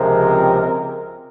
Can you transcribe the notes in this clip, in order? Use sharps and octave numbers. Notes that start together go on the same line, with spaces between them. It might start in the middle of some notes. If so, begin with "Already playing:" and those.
Already playing: C#2 C3 F3 G#3 C4 A#4